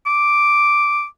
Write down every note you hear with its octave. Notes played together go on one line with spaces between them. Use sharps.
D6